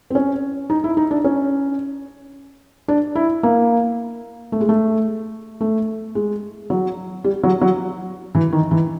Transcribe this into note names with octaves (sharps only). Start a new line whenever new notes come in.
C4
C#4
D#4
E4
D#4
D4
C#4
D4
E4
A#3
A3
G#3
A3
A3
G#3
F#3
G3
F#3
F#3
E3
D#3
E3